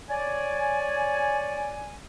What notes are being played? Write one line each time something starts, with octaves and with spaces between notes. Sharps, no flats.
C#5 D5 G#5